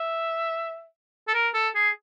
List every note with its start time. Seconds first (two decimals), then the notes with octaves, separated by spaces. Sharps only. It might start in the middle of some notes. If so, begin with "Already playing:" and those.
Already playing: E5
1.28 A4
1.34 A#4
1.54 A4
1.75 G#4